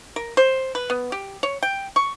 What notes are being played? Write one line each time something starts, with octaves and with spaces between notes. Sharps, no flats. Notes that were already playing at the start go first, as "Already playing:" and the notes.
A#4
C5
B4
B3
G4
C#5
G5
C#6